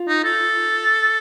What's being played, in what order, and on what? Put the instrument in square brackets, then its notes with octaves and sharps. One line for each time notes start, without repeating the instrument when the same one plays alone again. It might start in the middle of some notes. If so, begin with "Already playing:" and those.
Already playing: [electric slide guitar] F4
[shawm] D#4
A4